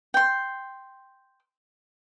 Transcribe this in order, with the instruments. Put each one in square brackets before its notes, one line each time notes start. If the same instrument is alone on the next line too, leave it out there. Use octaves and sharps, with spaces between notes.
[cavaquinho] G5 C6